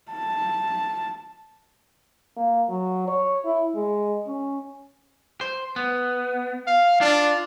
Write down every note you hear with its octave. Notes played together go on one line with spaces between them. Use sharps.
A5
A#3
F#3
C#5
E4
G#3
C#4
C5
B3
F5
D4 F4